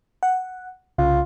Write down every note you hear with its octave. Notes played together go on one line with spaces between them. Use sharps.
F#5
C2 C#3 F4